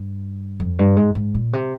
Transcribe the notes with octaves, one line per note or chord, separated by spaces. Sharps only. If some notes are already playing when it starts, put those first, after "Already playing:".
Already playing: G2
F2
G2
G#2
G#2
A#2
C3